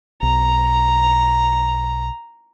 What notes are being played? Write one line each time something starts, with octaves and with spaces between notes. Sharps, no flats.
B1 A#5